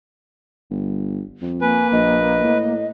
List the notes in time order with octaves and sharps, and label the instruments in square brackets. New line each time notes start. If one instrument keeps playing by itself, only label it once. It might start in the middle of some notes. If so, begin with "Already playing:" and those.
[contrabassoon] G1
F2
[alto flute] A#3 [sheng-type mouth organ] B4 [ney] G#5
[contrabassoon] A#1 [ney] D#5
[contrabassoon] A2